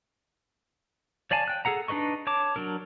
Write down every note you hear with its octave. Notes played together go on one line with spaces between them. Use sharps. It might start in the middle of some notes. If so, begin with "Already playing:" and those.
C#5 D5 F5 G#5 A5
G5 F#6
G#4 A4 F#5 A#5
D4 D#4 B4 D#5 C#6
C#5 A5 D6
F#3 D4 A#4